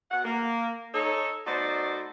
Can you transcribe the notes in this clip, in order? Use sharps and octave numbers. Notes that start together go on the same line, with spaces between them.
B2 F#5
A#3
D#4 A4 C#5
B2 A3 D#4 F#4 C5 D5